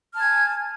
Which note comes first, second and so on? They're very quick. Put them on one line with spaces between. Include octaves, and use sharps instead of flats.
F6 A5 G#6 G#5